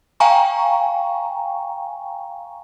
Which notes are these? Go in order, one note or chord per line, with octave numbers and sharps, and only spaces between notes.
F5 G5 G#5 A#5 C#6